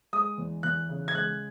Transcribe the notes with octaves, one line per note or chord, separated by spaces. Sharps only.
G#3 D#6
E2
E2 F#6
C#3
G#6
G#3 F#6